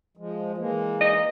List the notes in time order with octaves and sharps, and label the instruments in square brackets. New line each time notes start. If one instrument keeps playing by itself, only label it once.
[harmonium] F3 G#3
E3 G#3 A#3
[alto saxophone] D#5